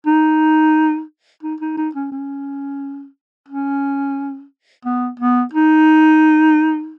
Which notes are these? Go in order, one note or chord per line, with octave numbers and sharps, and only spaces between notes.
D#4
D#4
D#4
D#4
C#4
C#4
C#4
B3
B3
D#4